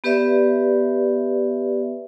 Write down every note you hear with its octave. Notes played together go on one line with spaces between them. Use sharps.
B3 G4 B4 D5 E5